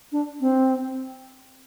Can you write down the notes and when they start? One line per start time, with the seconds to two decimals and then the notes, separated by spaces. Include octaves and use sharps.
0.12 D4
0.41 C4